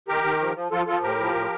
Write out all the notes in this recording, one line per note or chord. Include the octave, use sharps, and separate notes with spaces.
D#3 G4 A#4
D#3
F3
F3
F3 F4 A4
F3 F4 A4
A2 G4 A#4
F3
A2